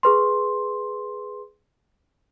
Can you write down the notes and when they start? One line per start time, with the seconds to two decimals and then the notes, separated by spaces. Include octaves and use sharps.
0.03 G#4 B4 C6